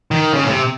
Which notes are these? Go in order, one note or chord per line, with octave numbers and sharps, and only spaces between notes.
D#3
C#3
A2
C3